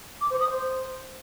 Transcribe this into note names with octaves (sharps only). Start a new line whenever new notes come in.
D6
C5
D#6
C5